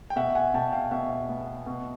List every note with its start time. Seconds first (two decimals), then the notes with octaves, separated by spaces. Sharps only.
0.10 G5
0.16 B2 E5 F#5
0.35 F#5 G#5
0.54 B2 G5 A5
0.72 F5 G5
0.91 B2 E5 F#5
1.29 B3
1.66 B2